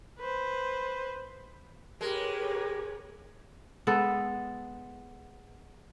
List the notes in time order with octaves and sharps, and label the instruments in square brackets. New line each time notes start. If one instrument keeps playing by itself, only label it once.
[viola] B4 C5
[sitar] G#3 [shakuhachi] G4 [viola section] A#4 B4 C#5
[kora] G#3 B3 A4